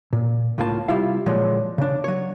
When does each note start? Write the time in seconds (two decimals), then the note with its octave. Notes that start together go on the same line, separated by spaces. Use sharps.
0.13 A#2
0.58 C#2 A2 A#3 F4 G#5 A5
0.88 C3 G3 E4 F4 F5
1.26 A#2 D3 F3 F#3 G#3 D4
1.78 C#3 D4
2.04 F#3 C#5